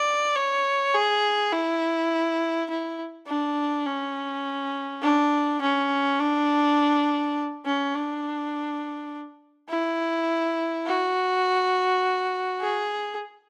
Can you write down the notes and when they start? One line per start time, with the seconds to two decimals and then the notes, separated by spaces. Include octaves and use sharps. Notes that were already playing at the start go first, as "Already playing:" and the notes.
Already playing: D5
0.36 C#5
0.95 G#4
1.53 E4
2.70 E4
3.27 D4
3.86 C#4
5.03 D4
5.62 C#4
6.20 D4
7.66 C#4
7.95 D4
9.69 E4
10.86 F#4
12.61 G#4